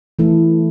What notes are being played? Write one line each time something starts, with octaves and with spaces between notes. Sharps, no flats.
E3 A3 E4 A4